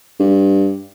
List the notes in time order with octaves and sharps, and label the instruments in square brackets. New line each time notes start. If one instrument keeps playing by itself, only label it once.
[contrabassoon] G2